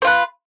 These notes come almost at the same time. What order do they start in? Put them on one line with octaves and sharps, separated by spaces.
C5 F4 B4